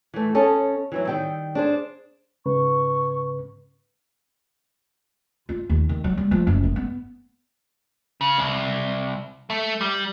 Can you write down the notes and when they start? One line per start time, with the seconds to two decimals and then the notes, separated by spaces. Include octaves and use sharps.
0.14 E3 A3
0.35 C#4 A4 D#5 G#5 A5
0.92 E3 F#3 E4
1.07 D#3 G3 G5
1.55 D4 G#4 C5
2.46 G#2 C#3 B4 C#6
5.49 F4
5.70 D#2
5.89 D#3
6.04 F#3
6.17 G3
6.31 F3
6.47 F#1
6.64 D#3
6.76 B3
8.21 C#3
8.38 C2
9.50 A3
9.81 G3